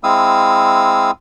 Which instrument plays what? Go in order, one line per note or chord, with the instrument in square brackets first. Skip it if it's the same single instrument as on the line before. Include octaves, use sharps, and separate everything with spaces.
[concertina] G#3 C4 E4 F5 D#6 E6